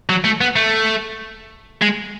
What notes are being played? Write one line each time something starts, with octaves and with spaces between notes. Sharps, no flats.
F#3
A3
B3
A3
G#3